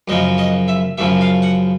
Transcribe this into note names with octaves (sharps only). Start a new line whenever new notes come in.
F#2 C#3 F3 D#5
D#5
E5
F#2 C#3 F3 E5
F5
F#5